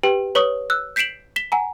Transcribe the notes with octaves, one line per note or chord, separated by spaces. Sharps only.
G4 B4 G5
B4 C#5 C#6 D#6
E6 F#6
G6 B6 C7 D7 E7 F#7
B6 E7 G7
F#5 G#5 A#5